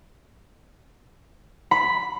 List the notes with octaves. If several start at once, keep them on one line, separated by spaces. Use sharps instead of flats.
B5